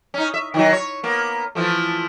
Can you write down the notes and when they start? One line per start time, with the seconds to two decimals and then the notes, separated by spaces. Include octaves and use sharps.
0.14 C#4 D#4
0.34 E5
0.54 D#3 F3 F#3
0.73 C#5
1.03 A#3 B3
1.55 E3 F3 A3